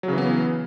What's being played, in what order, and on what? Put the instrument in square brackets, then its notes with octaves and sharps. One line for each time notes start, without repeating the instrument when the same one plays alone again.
[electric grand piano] F#3
C#3
E3
B3